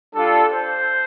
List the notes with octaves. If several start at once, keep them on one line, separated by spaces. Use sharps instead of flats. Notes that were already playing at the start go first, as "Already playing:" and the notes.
G3 D4 F4 A4
C5